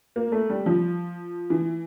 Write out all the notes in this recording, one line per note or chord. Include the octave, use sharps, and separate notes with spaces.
A#3
A3
G3
F3
E3